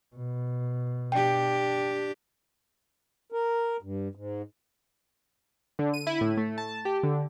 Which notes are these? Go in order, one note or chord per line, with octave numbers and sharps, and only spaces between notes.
B2
D4 G4 G5
A#4
G2
G#2
D3
D#7
E4
A2
A3
A5
G4
D3